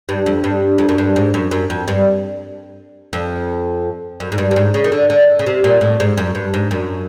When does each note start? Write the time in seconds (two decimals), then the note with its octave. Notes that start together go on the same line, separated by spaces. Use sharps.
0.09 G2
0.26 F2
0.44 G2
0.78 F2
0.89 F#2
0.98 G2
1.16 G#2
1.34 F#2
1.51 F#2
1.70 F2
1.88 G2
3.13 F2
4.20 F#2
4.32 G#2
4.38 G2
4.51 G2
4.56 G#2
4.74 C#3
4.84 D#3
4.92 D3
5.10 D3
5.39 C#3
5.46 C3
5.64 A#2
5.81 A2
6.00 G#2
6.17 F#2
6.35 G2
6.54 G#2
6.71 F#2